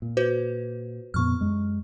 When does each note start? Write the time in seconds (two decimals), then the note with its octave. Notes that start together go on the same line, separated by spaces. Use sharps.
0.02 A#2
0.17 F#4 B4 C5
1.14 F2 A#2 B3 C#6 F6
1.41 F#2 G#3